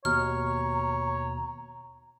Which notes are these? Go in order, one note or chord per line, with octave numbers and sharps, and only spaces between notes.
D#2 B2 C#5 A#5 F6